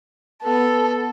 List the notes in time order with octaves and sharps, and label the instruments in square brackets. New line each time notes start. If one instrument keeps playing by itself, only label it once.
[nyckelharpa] B3 [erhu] A4